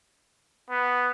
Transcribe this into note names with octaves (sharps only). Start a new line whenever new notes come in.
B3